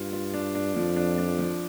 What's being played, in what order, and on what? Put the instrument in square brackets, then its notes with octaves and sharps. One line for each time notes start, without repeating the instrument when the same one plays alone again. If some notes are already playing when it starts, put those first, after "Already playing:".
Already playing: [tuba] G2 [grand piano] F4
[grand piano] F4
D4
D4
[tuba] F2 [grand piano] F3
[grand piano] D4
D4
F3